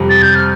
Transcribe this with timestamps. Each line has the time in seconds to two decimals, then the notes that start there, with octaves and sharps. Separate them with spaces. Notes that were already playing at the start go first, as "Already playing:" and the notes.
Already playing: F2 C3 G3
0.09 A6
0.22 G6
0.35 F6